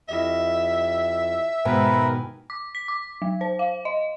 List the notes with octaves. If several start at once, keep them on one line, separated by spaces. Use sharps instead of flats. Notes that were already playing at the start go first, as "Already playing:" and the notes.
F2 E4 G4 D#5 E5
G#2 B2 D#3 A#4 B4 G5 G#5 B5
D6
B6
D6
F#3
C5
F5
D#5